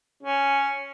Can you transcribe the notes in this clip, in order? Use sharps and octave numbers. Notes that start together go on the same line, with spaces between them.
C#4